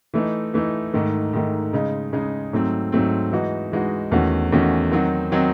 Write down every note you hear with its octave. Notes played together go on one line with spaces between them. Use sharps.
E3 A3 D#4
E3 A3 D#4
G#2 D#3 A3
G#2 D#3 A3
C#3 G#3 D#4
C#3 G#3 D#4
G#2 F#3 A3 C4
G#2 F#3 A3 C4
E3 G#3 D#4 F#4
E3 G#3 D#4 F#4
E2 D#3 A3 C#4 F#4
E2 D#3 A3 C#4 F#4
D#3 F#3 C4 D#4 F#4
D#3 F#3 C4 D#4 F#4